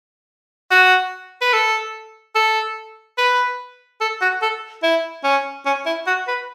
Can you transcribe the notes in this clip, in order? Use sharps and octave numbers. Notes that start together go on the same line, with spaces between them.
F#4
B4
A4
A4
B4
A4
F#4
A4
E4
C#4
C#4
E4
F#4
B4